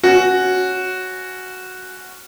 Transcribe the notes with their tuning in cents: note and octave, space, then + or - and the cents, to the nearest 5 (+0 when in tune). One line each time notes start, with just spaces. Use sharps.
C#4 +0 F#4 +0